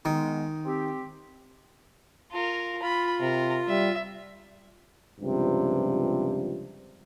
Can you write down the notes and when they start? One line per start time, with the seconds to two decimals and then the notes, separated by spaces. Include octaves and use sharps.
0.05 D#3 G#3 B3
0.65 C4 G4
2.32 F4 A#4
2.83 F4 B5
3.20 C3 A#4
3.68 G3 E5
5.20 C#2 G2 C3 F3 G3